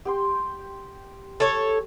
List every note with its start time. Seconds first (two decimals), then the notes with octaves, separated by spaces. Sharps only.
0.05 G4 G5 C6
1.40 A4 C#5